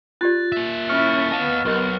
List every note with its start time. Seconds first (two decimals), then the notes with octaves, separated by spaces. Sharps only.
0.21 F4 G4 D5 F#6 A6
0.52 A#3 E5
0.89 C#4 E4 C#6 F6 C#7
1.32 B3 D#5 F5 A5
1.65 B1 G4 A#4 D#5